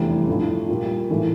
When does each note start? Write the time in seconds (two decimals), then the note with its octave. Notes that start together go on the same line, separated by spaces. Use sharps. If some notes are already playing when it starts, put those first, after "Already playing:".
Already playing: F1 E2 E3 G3 D4
0.27 A1 G2 F3 A3 E4
0.68 A#2 G3 A#3 F4
1.09 A2 E3 A#3